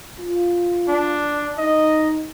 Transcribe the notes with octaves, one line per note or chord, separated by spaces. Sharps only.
F4
D4
D#4 D#5